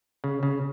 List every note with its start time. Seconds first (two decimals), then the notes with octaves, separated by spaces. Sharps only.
0.24 C#3
0.43 C#3